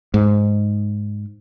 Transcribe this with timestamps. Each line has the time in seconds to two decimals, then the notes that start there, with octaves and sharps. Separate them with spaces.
0.14 G#2